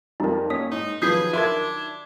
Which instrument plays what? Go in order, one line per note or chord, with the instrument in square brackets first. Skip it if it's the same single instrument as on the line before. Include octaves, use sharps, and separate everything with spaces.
[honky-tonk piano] F2 F3 G3 [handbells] D#4 A#4
[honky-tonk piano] F#2 C#4 C#5 [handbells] A#3 D#6 B6
[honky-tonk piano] G#2 [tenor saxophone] D#4
[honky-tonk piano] D#3 F#3 [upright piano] F3 B4 [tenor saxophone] G#4 [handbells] G6 B6 C7
[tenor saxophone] D4 [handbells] F4 A#4 [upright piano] E5 C6 G#6